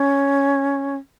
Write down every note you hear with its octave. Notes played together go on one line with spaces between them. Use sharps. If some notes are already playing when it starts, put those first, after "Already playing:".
Already playing: C#4